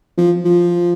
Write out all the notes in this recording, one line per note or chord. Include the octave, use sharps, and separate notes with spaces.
F3
F3